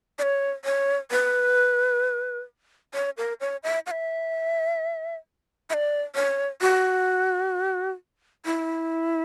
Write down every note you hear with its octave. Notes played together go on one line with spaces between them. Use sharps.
D5
C#5
C#5
B4
C#5
A#4
C#5
E5
F#5
E5
E5
D5
C#5
F#4
E4